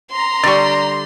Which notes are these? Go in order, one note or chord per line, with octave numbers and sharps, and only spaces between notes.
A#5 C6
D3 G3 D5 C#6